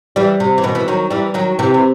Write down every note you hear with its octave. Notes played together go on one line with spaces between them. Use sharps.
E3 G3
C3
E3
B2 D#3
E3
D#3 F#3
E3 G3
D#3 F#3
C3 E3
E3